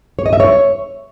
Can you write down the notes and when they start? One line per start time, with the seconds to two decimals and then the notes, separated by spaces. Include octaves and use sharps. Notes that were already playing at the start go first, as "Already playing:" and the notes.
0.19 C#5
0.26 D#5
0.33 E5
0.40 C#5